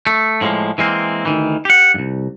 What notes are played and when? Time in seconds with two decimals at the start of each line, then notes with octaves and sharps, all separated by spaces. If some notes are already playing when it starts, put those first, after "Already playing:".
0.07 A3
0.41 A2 F3 F#3 G#3 A#3
0.78 E3 G#3 A#3 C4
1.25 D2 D#3 E3
1.65 G4 F#5
1.94 C2 G2